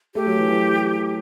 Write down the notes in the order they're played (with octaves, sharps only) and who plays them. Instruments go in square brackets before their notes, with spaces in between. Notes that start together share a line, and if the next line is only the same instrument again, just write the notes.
[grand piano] A3 [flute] G4
[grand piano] F#3
E3
E3